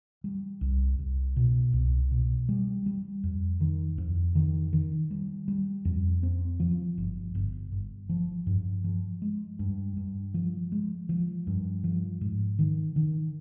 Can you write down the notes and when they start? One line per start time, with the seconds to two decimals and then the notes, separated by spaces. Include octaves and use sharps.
0.24 G3
0.61 C2
0.99 C2
1.36 B2
1.73 C2
2.11 B2
2.49 G3
2.86 G3
3.23 F2
3.61 D#3
3.98 F2
4.35 D#3
4.73 D#3
5.11 G3
5.48 G3
5.85 F2
6.23 C4
6.60 F3
6.98 G1
7.35 G1
7.72 G1
8.09 F3
8.47 G2
8.84 F3
9.22 G#3
9.59 G2
9.97 G2
10.34 F3
10.72 G#3
11.09 F3
11.47 G2
11.84 F3
12.21 G#2
12.59 D#3
12.96 D#3